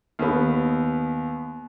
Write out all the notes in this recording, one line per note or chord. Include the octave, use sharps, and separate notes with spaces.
D#2 B3